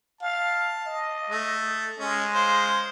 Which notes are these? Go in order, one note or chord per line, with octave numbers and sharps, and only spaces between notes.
F5 A5
D#5
A3
G#3 C#4
C5 F5